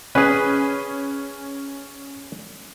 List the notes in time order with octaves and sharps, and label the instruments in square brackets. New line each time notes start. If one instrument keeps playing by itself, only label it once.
[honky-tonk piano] C#4 [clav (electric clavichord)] G#4 B4